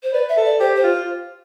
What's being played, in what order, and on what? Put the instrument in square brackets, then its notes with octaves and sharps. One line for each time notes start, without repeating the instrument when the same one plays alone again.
[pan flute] C5
[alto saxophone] B4 [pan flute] D5
[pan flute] E5
[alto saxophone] A4
[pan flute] D5
[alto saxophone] G4 [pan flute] C5
[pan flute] C5
[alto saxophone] F4